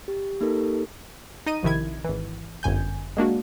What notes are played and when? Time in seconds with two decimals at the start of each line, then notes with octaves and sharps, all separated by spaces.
0.08 G4
0.41 A#3 D#4 G4 A4 A#4
1.46 D#4 D#5 D#7
1.63 A#1 C3 D#3 E4 G#6
2.04 G#1 E3
2.63 G1 F#2 G#5 G6
3.17 G#3 A#3 D4 F#4